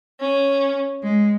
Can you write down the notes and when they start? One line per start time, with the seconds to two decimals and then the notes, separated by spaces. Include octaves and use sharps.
0.20 C#4
1.02 G#3